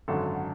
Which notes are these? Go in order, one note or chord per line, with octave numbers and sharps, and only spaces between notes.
G#1 F#2 D3 F#3 A4